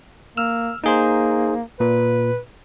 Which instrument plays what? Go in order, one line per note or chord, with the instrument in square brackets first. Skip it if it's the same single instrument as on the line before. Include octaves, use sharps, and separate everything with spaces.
[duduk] A#3 [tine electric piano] E6 F6
[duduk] A#3 [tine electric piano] D#4 G#4 C5
[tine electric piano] A#2 [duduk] B4